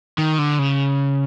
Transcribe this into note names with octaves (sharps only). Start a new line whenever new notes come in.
D#3
D3
C#3